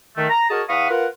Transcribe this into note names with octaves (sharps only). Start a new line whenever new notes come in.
D#3 A3
A#5
F#4 G#4 A#4 C#5 D#5 A5
E2 F5 F#5 B5 C#6 D#6
F4 A#4 B4 F#5